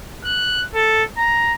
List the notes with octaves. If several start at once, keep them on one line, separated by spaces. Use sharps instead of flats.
F#6
A4
A#5